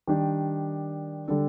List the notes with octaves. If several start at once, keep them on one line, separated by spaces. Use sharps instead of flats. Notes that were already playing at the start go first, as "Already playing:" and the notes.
D#3 G3 D4 G4 D5
D3 G3 D4 A4